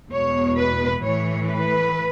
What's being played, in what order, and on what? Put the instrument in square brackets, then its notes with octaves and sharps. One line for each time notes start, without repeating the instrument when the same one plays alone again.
[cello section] E2 B2 G#3 C#5
B4
A2 E3 A3 C#5
B4